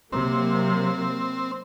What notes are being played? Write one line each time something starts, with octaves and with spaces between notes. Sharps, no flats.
C3 F#3 A#3 C4